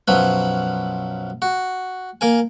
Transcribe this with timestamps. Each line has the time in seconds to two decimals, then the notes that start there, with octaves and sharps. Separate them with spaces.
0.08 B1 F#2 F3 F#3 B4 B5
1.42 F#4
2.21 A#3 A#4 G#5